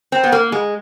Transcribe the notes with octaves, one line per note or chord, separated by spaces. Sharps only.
C4
B3
A#3
G#3